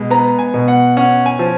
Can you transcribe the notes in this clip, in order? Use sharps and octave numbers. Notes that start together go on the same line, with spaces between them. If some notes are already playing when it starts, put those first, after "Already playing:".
Already playing: B2 G#3
B3 A#5
G#5
B2
F#5
C#4 F#5
G#5
F3